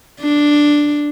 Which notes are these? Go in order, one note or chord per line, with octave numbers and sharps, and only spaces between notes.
D4